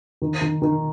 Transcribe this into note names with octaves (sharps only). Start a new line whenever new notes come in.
D#3
D#3
D#3